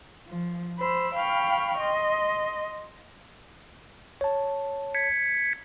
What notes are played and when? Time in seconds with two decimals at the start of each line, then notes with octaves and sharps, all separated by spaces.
0.27 F3
0.79 C5 B5 E6
1.14 F5 G5 B5 C#6 F6
1.77 D#5 C6
4.21 C#5 A5
4.94 G#6 B6 C#7